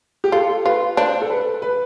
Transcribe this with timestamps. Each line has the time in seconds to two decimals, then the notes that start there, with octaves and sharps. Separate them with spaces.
0.24 G4
0.32 F4 A4
0.65 F4 B4
0.97 D4 C5
1.22 A4
1.30 B4
1.62 B4